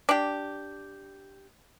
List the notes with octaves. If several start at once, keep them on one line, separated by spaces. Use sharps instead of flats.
D4 G4